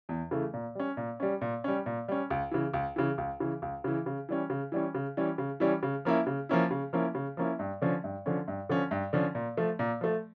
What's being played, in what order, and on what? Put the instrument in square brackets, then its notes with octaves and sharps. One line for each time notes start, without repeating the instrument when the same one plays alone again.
[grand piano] E2
C#3 E3 A3
A#2
G3 C#4
A#2
G3 C#4
A#2
G3 C#4
A#2
G3 C#4
C#2
C#3 E3
C#2
C#3 E3
C#2
C#3 E3
C#2
C#3 E3
C#3
E3 G3 C#4
C#3
E3 G3 C#4
C#3
E3 G3 C#4
C#3
E3 G3 C#4
C#3
F3 A#3 C#4 E4
C#3
F3 A#3 C#4 E4
C#3
F3 A#3 C#4 E4
C#3
F3 A#3 C#4 E4
G2
D3 F3 C#4
G2
D3 F3 C#4
G2
D3 F3 C#4
G2
D3 F3 C#4
A#2
F3 A3
A#2
F3 A3